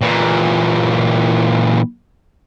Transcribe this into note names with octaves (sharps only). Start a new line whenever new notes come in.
A#2 E3